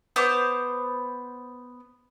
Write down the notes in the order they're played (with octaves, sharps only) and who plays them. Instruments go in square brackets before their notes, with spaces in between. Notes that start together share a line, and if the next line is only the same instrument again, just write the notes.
[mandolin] B3 C5 D6